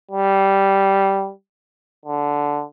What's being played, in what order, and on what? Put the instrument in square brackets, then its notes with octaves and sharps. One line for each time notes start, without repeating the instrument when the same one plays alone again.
[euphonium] G3
D3